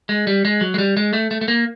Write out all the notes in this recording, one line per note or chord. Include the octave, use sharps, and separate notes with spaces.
G#3
G3
G#3
F#3
G#3
G3
G#3
A3
A3
A3
A#3